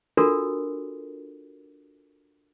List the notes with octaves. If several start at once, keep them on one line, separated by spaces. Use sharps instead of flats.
D4 F4 F#4 A4 A#4